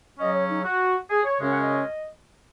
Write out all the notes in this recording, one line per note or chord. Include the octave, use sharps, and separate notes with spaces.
C#3 F#3 C#4 D#5
C#5
D#4
F#4
G#4
C#5
F#2 C#3 G#3 C#4
F#5
D#5